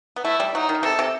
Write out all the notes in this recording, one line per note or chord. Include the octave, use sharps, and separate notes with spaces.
B3
A3 E4
G3
F#3 D#4
D#3
C3 A4
C3